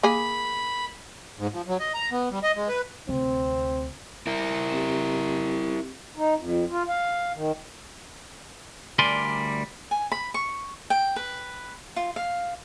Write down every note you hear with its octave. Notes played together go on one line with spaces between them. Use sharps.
A#3 G#4 G#5 B5
G#2
F3
F#3
D#5
A#5
B3
G3
D#5
G#3
B4
D2 C3 C4
E4 A#4
C4 G4
D#4
F2
F4
F5
D#3
D2 G3 A#4 D5 G#5 C6
G#5
B5
C#6
G5
B4
F4
F5